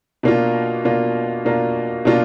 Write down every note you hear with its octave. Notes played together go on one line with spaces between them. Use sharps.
B2 A#3 D4 F4
B2 A#3 D4 F4
B2 A#3 D4 F4
B2 A#3 D4 F4